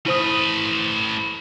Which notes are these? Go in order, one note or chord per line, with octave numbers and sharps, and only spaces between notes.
A3 E4 B4 C5 D#6